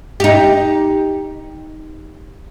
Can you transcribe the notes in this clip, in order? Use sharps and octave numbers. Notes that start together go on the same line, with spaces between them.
D#4 G4